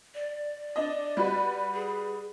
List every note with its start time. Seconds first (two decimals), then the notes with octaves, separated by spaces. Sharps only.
0.15 D5
0.76 D4 D#5
1.17 G3 F#4 B4
1.75 G#4